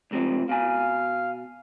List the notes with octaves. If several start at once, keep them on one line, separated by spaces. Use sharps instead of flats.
C#2 C3 F3
B2 F5 G#5